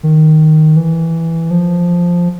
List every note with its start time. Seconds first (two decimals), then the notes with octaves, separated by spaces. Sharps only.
0.03 D#3
0.77 E3
1.51 F3